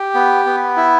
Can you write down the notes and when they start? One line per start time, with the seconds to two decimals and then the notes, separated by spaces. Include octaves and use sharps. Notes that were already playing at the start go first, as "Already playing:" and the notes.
Already playing: G4
0.15 B3
0.46 B3
0.77 E4